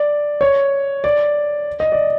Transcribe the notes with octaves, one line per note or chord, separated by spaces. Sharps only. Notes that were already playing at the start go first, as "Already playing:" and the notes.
Already playing: D5
C#5
D5
D#5
D5